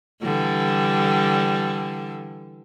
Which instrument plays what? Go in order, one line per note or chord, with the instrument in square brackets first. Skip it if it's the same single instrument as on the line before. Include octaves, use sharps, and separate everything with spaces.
[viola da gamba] D3 E3 G3